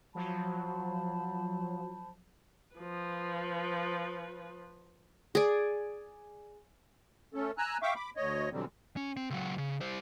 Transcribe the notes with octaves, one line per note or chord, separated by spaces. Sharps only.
F3 F#3 C5 A5 B5
F3 B4
G#4 D5
A3 C#4 A4
G#5 A#5 E6 F#6
E5 F5 G5 C#6 D6
B5 D6
D2 C#5 D#5
B2 D3 E3 F#3 G3 C4
C#4
C4
C#2 F#3
C#3
G3 C5